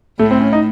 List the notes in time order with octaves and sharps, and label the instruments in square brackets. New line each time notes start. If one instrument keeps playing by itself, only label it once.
[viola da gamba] A2 [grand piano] A3
[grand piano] C4
C#4
D#4